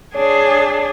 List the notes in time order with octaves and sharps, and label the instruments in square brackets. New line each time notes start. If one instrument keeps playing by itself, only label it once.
[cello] D4 G#4 [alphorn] C#5